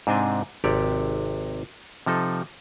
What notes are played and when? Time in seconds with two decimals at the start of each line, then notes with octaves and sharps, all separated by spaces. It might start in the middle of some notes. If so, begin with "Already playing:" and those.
0.07 G#2 C3 C4 D4 D#5 G#5
0.64 G#1 C3 G4 C#5 D5
2.06 C3 F3 D#4 A4